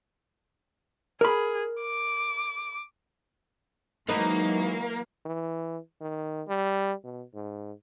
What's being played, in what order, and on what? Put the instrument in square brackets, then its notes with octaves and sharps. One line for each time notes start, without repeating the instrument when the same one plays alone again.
[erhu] G#4 [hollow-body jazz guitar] A#4 B5
[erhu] D6
[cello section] E3 F#3 G#3 [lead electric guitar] A#3 [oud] D#4 A#4 B4
[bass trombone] E3
D#3
G3
B2
G#2